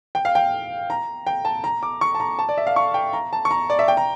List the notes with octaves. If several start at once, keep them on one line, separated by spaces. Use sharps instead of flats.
G5
F5
G5
A#5
G5
A5
A#5
D6
C#6
A5
A#5
A5
D5
E5
F5
C#6
G5
A#5
A5
C#6
A#5
D5
E5
G5
A#5